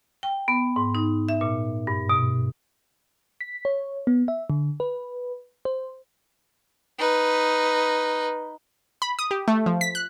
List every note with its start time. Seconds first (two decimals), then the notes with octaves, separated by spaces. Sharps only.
0.23 G5
0.48 B3
0.76 G#2
0.95 D#4
1.29 E5
1.41 A#2
1.87 G2
2.09 B2
3.41 B6
3.65 C#5
4.07 B3
4.28 E5
4.50 D3
4.80 B4
5.65 C5
6.98 D#4 B4
9.02 B5
9.19 D#6
9.31 G4
9.48 A3
9.66 F3
9.81 B6
9.95 F#6